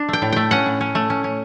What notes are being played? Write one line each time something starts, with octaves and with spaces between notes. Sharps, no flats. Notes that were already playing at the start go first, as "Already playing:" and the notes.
Already playing: D4
A3 G5
A2
A3 G5
C#4 F#5
A2
C#4
A3
C#4
C#4